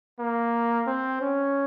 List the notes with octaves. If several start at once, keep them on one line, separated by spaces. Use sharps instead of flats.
A#3
C4
C#4